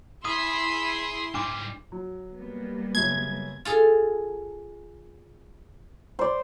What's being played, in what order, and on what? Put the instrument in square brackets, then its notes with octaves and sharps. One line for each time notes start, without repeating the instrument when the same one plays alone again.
[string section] E4 C6 [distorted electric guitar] G#4 [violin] B5 E6 [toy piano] D#6
[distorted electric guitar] G#2 G3 [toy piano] D4 D6
[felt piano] F#3
[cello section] G3 A#3 B3
[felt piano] F#2 C#3 [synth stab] G#6
[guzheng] F4 G#4 A4
[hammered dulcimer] C5 D5